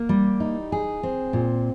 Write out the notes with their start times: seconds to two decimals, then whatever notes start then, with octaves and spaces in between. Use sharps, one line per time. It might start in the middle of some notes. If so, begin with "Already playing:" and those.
Already playing: A#3
0.09 G3
0.40 D#4
0.72 G#4
1.03 C4
1.33 A#2